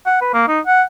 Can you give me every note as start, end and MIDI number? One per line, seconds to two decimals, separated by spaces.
0.06 0.18 78
0.21 0.33 71
0.34 0.45 58
0.48 0.60 63
0.66 0.83 78